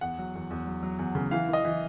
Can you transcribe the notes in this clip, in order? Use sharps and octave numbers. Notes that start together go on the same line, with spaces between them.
E2 F#5
F#3
E2
E2
F#3
F#3
E2
C#3
E3 F5
E3
D#5
E3